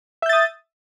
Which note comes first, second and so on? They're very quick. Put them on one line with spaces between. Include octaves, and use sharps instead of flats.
E5 G6 A6 D#6